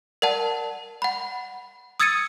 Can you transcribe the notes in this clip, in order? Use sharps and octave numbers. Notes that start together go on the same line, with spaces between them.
A#4 D5 F#5 A5
F#5 B5
D#6 E6 G#6 A6 C#7 D#7